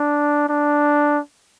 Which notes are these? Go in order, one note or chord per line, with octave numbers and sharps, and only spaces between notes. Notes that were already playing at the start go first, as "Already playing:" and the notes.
Already playing: D4
D4